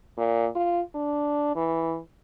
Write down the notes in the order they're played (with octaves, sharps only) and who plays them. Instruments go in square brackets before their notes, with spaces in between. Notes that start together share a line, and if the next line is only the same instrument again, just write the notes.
[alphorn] A#2
F4
D4
E3